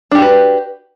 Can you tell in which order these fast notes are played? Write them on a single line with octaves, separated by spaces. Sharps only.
D4 G4 F#4 B4